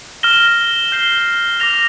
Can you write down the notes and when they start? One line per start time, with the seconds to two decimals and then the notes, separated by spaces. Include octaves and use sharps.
0.23 F6 A#6 E7 G7
0.92 G6 C7 G7
1.60 D6 F6 A#6 F7